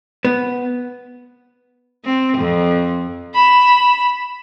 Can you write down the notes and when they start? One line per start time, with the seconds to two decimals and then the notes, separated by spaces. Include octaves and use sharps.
0.25 B3
2.05 C4
2.38 F2
3.34 B5 E7